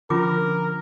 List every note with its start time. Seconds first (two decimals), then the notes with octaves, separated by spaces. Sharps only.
0.10 D3 F3 C#4 F4 A#4 D6